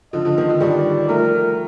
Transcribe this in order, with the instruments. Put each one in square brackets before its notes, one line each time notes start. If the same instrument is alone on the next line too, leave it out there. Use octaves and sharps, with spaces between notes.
[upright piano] D3 F3 [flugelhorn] D#5
[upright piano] D3 F3
D#3
D3 F3
[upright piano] D#3 G3 [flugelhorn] D5
[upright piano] F3 A3 [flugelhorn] A#4